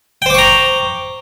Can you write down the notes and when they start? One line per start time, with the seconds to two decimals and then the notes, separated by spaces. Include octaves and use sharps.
0.22 G5
0.26 C5
0.30 D6
0.34 C#6
0.38 A#5